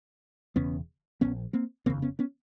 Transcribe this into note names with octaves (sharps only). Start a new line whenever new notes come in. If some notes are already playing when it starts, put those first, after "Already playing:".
E1 E2 C#3 B3 C#4
A#1 A#2 B3 C#4
A#3 C4
F1 D#2 C#3 A#3 C4
B3 C#4
B3 C#4